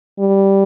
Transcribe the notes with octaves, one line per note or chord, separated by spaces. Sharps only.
G3